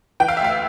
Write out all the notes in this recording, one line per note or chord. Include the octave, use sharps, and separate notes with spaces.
E3 G5
F5
E5
D2 F5